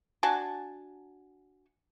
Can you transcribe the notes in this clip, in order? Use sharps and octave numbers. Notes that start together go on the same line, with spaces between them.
D4 F#4 G#5 A5